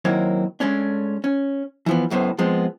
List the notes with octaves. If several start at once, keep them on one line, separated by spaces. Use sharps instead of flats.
D#3 F#3 A#3 C4 E4 C#5
G#3 A3 C#4 D4
C#4
E3 F3 B3
C#2 F#2 A2 B3 C5
F3 G#3 B3 C4